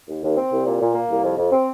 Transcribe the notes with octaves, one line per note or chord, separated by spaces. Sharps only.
D#2
D#2
C4
C2
A#2
A#2
A#3
C2
F2
F2
C4